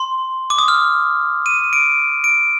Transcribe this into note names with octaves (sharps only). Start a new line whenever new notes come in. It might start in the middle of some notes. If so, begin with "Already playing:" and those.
Already playing: C6
D6
D#6
F6
D#7
D7
D7